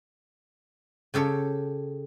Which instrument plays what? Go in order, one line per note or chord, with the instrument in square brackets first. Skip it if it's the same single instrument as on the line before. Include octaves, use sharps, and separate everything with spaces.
[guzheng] C#3 G4 A4 C#5